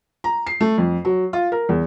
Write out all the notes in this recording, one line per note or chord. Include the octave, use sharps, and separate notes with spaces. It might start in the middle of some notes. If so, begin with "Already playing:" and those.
A#5
C7
A3
F2
F#3
F4
A#4
E2